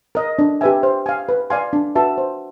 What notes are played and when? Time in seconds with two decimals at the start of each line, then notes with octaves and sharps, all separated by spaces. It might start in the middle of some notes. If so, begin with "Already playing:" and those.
0.15 A#4 D#5
0.39 D4
0.61 G4 B4 E5 G#5
0.83 C5
1.06 F5 G#5
1.29 B4
1.50 D5 F5 G#5 C6
1.73 D4
1.95 F#4 B4 E5 A5
2.18 C5